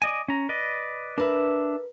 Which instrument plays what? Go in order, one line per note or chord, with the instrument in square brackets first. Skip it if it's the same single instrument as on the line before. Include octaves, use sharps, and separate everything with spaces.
[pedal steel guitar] D5 D#5 G#5
C#4 A#5
B4 D5 D#5
[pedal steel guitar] D4 E5 [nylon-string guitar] A#4 B4